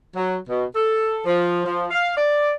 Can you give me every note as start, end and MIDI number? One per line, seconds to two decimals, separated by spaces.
0.16 0.36 54
0.49 0.65 47
0.76 1.19 69
1.26 1.62 53
1.66 1.87 53
1.91 2.12 77
2.17 2.52 74